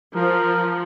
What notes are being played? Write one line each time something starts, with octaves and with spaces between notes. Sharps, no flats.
F3 A#4